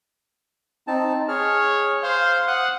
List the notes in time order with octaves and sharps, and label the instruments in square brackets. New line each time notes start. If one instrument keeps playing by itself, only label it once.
[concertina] C4 D#4 A5
[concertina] G#4 F6 [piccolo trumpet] C#5
[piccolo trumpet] C5 [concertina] F5
[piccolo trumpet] F#5 [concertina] D#6 F#6